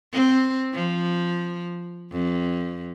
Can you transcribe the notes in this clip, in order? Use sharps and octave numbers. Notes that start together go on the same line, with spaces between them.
C4
F3
F2